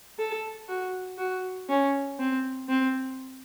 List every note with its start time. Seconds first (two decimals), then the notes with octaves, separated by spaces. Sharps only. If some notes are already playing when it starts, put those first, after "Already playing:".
0.18 A4
0.68 F#4
1.18 F#4
1.69 C#4
2.19 C4
2.69 C4